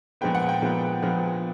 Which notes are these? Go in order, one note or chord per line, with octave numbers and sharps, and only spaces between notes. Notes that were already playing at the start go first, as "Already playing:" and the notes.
A#2 F3 G#3 B3 G5
F#5
G5
A#2 F3 G#3 B3
A#2 F3 G#3 B3